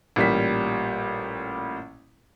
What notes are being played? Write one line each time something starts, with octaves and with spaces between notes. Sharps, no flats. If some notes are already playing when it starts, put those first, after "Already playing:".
A1 A#2 G3 A#3 B6